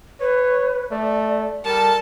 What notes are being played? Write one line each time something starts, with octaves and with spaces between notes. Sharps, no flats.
B4 C#5
A3 D5
G3 A4 A#4 A5